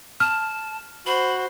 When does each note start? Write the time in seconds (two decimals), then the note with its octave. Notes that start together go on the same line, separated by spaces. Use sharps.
0.20 A5 F6
1.06 F#4 C5 B5